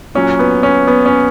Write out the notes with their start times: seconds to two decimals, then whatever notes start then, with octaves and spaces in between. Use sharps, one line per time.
0.15 A#2 F#3 C#4
0.39 B3
0.63 C#4
0.87 B3
1.06 C#4